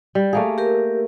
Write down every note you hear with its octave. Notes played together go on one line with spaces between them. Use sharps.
G3
A3 A#3 G#4 F5
G4 A#4